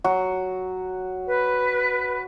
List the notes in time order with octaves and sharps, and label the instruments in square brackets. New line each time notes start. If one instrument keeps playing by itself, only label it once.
[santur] F#3 F#4
[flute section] B4